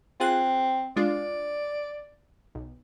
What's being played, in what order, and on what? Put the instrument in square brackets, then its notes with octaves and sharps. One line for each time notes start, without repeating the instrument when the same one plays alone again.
[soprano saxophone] C4 [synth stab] F4 G#4 F#6
[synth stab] G#3 D4 F4 [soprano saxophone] D5
[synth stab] B1